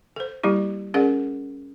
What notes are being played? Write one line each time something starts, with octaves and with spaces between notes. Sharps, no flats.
A4 C5
G3 A#3 E4 G4
C#4 G#4 A#4 D5 F#5